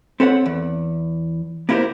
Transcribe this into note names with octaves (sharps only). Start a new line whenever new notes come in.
C4 A4 B4 C#5 F#5
E2
A#3 B3 E4 G4 A#4 C5